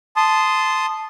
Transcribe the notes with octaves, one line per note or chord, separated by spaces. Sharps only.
A5 C6 D#6